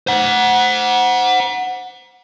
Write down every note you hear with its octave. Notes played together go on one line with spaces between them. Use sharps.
C5 F#5